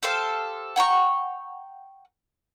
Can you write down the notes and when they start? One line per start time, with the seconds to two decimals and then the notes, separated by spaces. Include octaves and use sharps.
0.03 G4 A4 C5 F5
0.76 F#5 G5 A#5 C#6